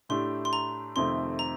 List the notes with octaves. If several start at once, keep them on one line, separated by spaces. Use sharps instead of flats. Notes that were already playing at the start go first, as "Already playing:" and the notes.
A2 A3 D4 G4 C6
C6
A#5
F2 C3 D#3 A3 C4 C6
A#5